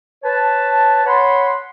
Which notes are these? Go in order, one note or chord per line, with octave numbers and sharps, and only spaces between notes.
B4 C#5 A5
C#5 F#5 B5 C6